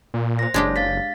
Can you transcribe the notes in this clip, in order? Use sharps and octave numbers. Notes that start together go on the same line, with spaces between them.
A#2
C5 A#6
F#1 G#3 D4 G4 C#5
F5 A6 B6